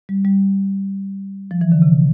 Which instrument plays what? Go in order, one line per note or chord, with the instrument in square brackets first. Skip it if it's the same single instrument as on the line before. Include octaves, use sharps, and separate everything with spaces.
[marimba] G3
G3
F3
E3
D3
C3